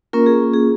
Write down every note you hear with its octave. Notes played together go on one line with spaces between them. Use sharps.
A#3 C#4 F4 A#4
G#4
G#4